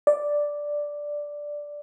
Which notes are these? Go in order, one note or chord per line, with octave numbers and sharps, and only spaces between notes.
D5